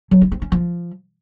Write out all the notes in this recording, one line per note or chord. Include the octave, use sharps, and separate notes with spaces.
F#3
E4
C4
C#4
F3